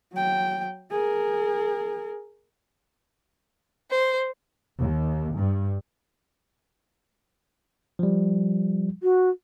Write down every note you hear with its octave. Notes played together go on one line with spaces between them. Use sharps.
F#3 G5
G#4 A#4
C5
D#2
G2
F3 G3
F#4